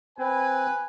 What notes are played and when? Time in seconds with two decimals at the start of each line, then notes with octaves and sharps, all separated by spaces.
0.19 C4 B4 G#5